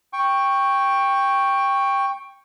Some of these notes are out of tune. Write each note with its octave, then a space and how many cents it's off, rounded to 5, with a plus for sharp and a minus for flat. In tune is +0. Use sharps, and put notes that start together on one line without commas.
G5 +10 C#6 -5